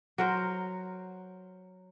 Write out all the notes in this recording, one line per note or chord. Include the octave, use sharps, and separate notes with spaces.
F#3 A#4 C5